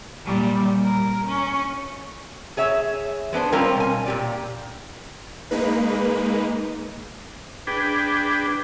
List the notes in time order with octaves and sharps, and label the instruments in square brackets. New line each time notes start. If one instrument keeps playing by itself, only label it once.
[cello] A#2 G3
A#4
C#4
[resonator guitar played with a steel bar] G#4 C#5 E5
G#3 B3 D4 C5
G3 C4 C#4 F4 A#4 G#5
B2 G#5
A#2 G4 D5
[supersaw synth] G#3 A#3 D#4 B4
[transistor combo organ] D4 G#4 B4 G5